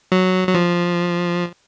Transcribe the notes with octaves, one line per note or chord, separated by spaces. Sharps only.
F#3
F#3
F3